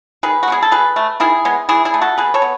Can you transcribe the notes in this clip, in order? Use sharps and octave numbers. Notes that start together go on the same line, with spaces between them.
D#3 G#4 B4
F#4
G#3 B3 G#4
A4
B2 G#4 B4
A3
D#3 E4 G#4
G#3 B3
E3 E4 G#4
E4 G#4
A3
F#4 A4
B2 G#4 B4
A4 C#5
B3